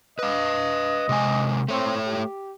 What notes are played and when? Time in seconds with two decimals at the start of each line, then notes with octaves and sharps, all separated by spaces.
0.19 B4 D#5 F5
1.09 C3 G#3 G#5
1.68 A3 C4 C#5
2.06 G4